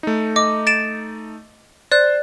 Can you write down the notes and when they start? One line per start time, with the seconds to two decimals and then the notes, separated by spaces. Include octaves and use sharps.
0.03 A3 D#4
0.36 D#5 D6
0.67 A6 D7 E7
1.91 C5 D5 F#6